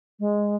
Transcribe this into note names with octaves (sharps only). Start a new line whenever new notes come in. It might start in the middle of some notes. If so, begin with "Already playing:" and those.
G#3